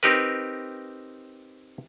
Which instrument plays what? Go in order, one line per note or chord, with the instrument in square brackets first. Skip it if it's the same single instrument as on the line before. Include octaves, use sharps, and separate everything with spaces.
[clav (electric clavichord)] C4 D#4 G4 A#4 B4